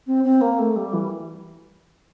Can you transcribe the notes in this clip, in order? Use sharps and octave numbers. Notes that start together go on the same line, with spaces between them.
C4
C4
A#3
A3
G3
E3